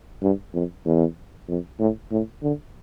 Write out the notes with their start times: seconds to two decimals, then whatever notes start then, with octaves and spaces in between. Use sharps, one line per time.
0.22 G2
0.54 F2
0.85 E2
1.48 F2
1.79 A2
2.11 A2
2.43 D3